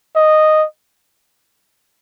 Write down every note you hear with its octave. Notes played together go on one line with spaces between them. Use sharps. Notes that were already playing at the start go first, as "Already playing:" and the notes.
D#5